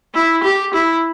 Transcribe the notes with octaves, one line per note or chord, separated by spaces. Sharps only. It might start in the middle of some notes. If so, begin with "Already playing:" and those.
E4
G4
E4